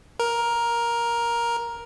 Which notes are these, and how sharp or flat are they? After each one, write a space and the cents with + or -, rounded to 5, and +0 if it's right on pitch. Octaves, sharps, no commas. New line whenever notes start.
A#4 +10